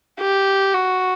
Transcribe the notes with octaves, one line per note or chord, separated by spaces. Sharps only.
G4
F#4